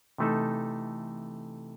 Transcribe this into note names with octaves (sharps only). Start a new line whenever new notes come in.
C3 E3 A3 D#4 A4